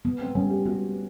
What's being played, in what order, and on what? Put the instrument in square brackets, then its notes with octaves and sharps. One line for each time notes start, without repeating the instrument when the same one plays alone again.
[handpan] B3
[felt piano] C4
[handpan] G3 [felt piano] C#4
[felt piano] G4
[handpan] B3 [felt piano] F#4